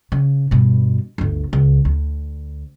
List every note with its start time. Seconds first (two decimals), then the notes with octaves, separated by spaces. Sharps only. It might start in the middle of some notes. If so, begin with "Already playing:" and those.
0.12 C#3
0.51 G2 B2
1.18 G1 D2
1.53 C#2
1.85 D2